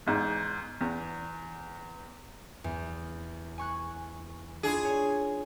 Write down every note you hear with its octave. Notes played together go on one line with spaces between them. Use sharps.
E2 G#2
E2
E2
G#5 C#6 F#6
D4 E4 F4 G#4
C#5